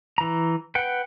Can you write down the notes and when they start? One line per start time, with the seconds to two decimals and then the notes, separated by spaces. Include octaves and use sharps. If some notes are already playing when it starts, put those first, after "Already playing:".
0.18 E3 A#5
0.75 B4 F#5 G5